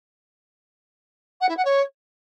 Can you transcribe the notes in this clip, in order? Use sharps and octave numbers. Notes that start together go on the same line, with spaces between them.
F#5
E4
F#5
C#5